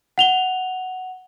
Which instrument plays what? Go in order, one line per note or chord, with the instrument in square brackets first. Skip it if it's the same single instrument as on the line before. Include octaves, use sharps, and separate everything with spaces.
[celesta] F#5 F7 G7